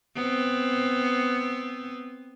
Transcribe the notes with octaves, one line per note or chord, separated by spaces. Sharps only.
B3 C4